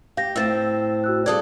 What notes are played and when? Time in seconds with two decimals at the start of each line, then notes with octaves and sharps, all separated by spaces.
0.17 G4 F5 G6 A#6
0.36 A2 C4 E6 A6 E7
1.04 F#4 E6 F#6
1.26 G2 G#4 A4 D5 D#6 G#6